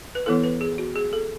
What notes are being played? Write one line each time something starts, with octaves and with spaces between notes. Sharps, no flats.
B4
E3 B3 E4 A4
B4
G#4
F#4
G#4
A4